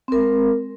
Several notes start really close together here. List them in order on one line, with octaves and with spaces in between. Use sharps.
C4 A#4 G#3